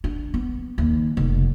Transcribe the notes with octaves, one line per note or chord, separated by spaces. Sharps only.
D4
B3
D#2
F1